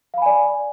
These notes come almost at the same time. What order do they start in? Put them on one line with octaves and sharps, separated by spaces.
F5 B5 G#5 D5